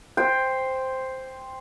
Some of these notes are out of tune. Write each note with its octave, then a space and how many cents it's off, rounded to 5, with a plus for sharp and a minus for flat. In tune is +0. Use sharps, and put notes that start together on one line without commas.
C5 +0 G5 +10